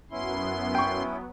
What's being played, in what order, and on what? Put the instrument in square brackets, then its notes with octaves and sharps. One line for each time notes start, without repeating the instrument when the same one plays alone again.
[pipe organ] F#2 C6 [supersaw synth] F#3 B3 [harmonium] C#4 E4
[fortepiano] G5 C#6